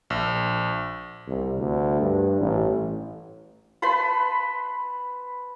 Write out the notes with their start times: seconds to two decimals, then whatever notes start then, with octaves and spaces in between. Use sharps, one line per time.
0.10 A#1
1.27 C2
1.58 D2
2.01 G2
2.41 A1
3.82 B4 A5 B5 C6